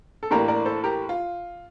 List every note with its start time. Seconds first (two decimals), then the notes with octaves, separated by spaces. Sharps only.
0.23 A4
0.31 A2 E3 A#3 D4 G4 A#4
0.48 A#4 D5
0.65 A4 C5
0.84 G4 A#4
1.09 F4